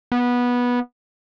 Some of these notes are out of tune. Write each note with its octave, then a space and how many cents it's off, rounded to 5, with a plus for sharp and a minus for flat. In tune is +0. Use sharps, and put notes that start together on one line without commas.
B3 -15